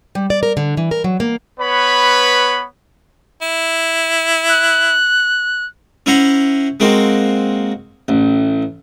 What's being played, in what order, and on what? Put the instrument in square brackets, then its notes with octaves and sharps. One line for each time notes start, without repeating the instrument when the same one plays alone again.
[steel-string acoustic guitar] G3
D5
A#4
D3
E3
A#4
F#3
A#3
[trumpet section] B3 B4 C#5 B5
[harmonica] E4
[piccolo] F#6
[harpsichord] C#4 E4 C5 F#5 A#5
G#3 A#3 C4 F#4
A1